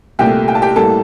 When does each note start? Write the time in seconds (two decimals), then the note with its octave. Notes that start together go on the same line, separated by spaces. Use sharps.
0.19 C2 A#2 A3 G4 G5
0.48 G5
0.55 A5
0.62 G4 G5
0.76 A2 G3 A#3 A4 A5